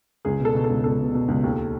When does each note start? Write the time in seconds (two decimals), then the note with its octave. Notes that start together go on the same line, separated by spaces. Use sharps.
0.25 C#2 G#4
0.40 B2
0.45 A4
0.55 B2
0.64 A4
0.69 C#2
0.84 C#2 A4
0.99 B2
1.14 B2
1.28 C#2
1.43 D#2